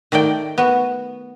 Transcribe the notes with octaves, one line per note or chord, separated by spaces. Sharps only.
D#3 A3 D5 G5
B3 F#4